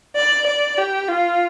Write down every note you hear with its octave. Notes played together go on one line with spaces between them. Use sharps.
D5
D5
G4
F4